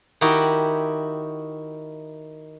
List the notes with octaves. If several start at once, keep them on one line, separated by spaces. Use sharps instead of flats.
D#3 D#4 E4 F#4 G4 G5